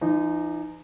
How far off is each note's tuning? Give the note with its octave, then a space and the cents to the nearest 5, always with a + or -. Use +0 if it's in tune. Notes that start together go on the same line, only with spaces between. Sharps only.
E3 +40 D#4 -20